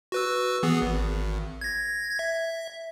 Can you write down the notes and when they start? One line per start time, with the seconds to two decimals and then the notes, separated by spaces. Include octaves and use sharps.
0.12 F#4 B4 E6
0.63 E3 B3 G#4
0.82 G#1
1.61 G#6 A#6
2.19 E5